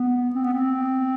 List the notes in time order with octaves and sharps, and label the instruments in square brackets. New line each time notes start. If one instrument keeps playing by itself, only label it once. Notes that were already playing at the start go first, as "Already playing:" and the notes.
Already playing: [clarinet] B3
C4
B3
C4